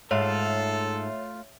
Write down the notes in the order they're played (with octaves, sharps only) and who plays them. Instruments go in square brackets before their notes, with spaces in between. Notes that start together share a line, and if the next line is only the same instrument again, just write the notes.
[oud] G#2 [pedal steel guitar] A3 F4 [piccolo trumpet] A4 [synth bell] C#5 E5